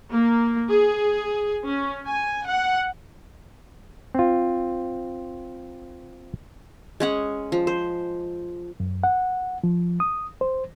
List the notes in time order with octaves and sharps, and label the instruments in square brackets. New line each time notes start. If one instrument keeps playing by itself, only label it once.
[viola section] A#3
G#4
C#4
G#5
F#5
[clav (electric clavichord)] C4 F4
[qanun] G#3 C#4 F#5
F3
C5
[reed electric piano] F#2
F#5
F3
D#6
C5